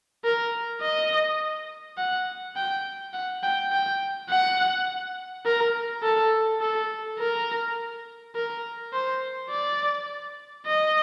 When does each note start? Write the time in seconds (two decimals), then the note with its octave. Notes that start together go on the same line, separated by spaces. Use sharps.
0.24 A#4
0.82 D#5
1.98 F#5
2.56 G5
3.13 F#5
3.43 G5
3.72 G5
4.30 F#5
5.46 A#4
6.03 A4
6.61 A4
7.19 A#4
8.35 A#4
8.93 C5
9.50 D5
10.66 D#5